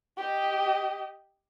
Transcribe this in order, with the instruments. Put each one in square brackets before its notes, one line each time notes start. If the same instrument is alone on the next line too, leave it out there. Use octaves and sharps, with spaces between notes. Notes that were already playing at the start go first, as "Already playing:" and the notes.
[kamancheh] G4 D#5